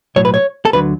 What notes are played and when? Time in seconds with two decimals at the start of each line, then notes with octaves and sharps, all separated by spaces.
0.16 B1 A2 F#3 C#5
0.25 B4
0.34 C#5
0.65 A4
0.73 D2 D3 F#3 B4